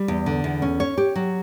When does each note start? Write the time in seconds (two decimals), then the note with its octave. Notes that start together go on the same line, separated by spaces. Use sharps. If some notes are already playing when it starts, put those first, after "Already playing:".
Already playing: G3
0.08 E2
0.26 D3
0.44 E2
0.62 C#4
0.80 C#5
0.98 G4
1.16 F#3